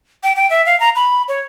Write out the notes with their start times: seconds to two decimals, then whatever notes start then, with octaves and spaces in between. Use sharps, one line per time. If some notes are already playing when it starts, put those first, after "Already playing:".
0.23 G5
0.36 G5
0.50 E5
0.66 F5
0.80 A#5
0.96 B5
1.28 C#5